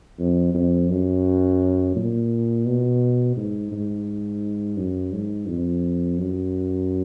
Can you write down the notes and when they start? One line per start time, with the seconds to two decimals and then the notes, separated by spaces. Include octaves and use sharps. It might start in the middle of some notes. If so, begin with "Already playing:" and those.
0.19 F2
0.55 F2
0.90 F#2
1.96 A#2
2.66 B2
3.37 G#2
3.72 G#2
4.77 F#2
5.13 G#2
5.48 F2
6.18 F#2